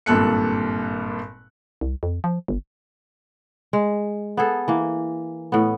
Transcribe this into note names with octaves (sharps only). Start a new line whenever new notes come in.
G#1 G2 A#2 A4 F#6 C#7
C2
F2
F3
G1
G#3
B3 G#4 A4
E3 A#3
A2 B3